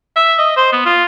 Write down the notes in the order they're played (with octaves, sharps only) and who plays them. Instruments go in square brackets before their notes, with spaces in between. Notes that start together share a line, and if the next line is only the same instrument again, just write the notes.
[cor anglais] E5
D#5
C5
B3
F4